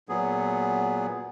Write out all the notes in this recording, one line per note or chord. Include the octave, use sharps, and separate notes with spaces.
A#2 F#3 B3 G#4